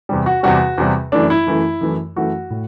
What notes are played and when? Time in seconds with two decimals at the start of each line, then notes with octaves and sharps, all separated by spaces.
0.09 E2 C3 G3
0.26 F#4
0.43 E2 C3 G3 F#4
0.78 E2 C3 G3
1.12 F#2 E3 A3 D4
1.30 E4
1.47 F#2 E3 A3
1.81 F#2 E3 A3
2.16 F#2 E3 A3 F#4
2.50 A2